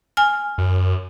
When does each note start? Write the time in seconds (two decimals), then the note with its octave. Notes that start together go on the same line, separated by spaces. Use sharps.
0.17 G#5 F6
0.58 F#2